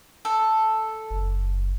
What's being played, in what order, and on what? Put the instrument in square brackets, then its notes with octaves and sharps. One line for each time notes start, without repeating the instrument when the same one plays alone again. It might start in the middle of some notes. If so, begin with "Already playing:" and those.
[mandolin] A4
[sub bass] F#1